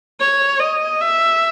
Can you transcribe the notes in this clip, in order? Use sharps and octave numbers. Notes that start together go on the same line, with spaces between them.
C#5
D#5
E5